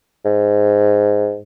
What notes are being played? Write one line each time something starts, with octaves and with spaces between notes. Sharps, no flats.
G#2